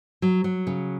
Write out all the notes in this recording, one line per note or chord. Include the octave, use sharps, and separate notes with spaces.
F#3
F#3
C#3